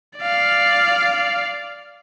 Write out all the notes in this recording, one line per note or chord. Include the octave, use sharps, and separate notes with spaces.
D5 F5